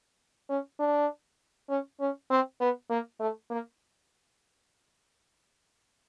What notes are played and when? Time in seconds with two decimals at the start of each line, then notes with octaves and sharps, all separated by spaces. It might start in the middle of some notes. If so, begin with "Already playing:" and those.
0.49 C#4
0.79 D4
1.69 C#4
2.00 C#4
2.30 C4
2.60 B3
2.90 A#3
3.20 A3
3.50 A#3